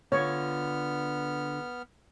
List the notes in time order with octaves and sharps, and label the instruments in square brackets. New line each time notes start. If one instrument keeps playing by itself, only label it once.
[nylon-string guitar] D3 F4 [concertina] B3 F6 [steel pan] C#5